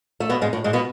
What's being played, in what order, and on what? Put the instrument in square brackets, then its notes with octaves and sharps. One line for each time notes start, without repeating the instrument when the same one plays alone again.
[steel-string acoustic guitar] A3
B2 B3
G#2 G#3
A2
G#2 G#3
B2 B3